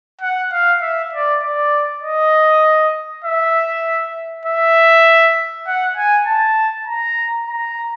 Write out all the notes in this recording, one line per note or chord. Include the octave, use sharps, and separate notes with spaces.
F#5
F5
E5
D5
D5
D#5
E5
E5
F#5
G#5
A5
A#5
A#5